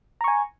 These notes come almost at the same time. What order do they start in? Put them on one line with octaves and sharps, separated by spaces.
A#5 C#6 G#5